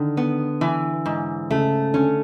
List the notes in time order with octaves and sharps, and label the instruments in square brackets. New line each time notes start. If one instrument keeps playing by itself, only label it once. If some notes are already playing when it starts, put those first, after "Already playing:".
Already playing: [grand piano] D3 [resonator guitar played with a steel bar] D#3
[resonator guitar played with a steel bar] B3
E3
G#2
[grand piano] C#3 [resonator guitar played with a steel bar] A3
[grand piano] D3 [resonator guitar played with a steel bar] C#4